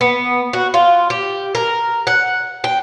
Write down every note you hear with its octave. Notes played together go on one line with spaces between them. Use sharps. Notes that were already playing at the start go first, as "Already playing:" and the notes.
B3
F#4
F4
G4
A#4
F#5
G5